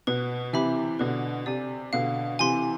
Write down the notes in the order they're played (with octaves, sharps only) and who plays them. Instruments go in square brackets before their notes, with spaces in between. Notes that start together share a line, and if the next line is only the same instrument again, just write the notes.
[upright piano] B2 [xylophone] B4
[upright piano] C3 E3 [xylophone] E5 B5 D6
[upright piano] B2 D3 [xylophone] B4
[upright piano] C3 [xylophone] D5 G#5
[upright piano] B2 D3 [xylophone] F5
[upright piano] C3 E3 [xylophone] G#5 C6